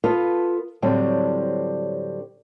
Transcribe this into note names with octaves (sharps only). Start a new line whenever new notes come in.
B3 F4 A4 B4
A2 D3 F#3 G3 C4